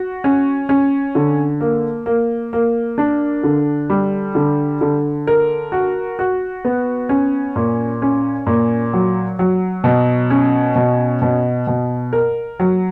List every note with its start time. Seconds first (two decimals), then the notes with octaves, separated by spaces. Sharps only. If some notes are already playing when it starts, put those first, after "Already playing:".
Already playing: F#4
0.24 C#4
0.69 C#4
1.15 D3
1.61 A#3
2.06 A#3
2.53 A#3
2.98 D4
3.44 D3
3.90 G3
4.35 D3
4.81 D3
5.27 A#4
5.72 F#4
6.19 F#4
6.65 B3
7.09 C#4
7.56 A#2
8.02 C#4
8.47 A#2
8.94 F#3
9.39 F#3
9.84 B2
10.30 C#4
10.76 B2
11.22 B2
11.67 B2
12.13 A#4
12.60 F#3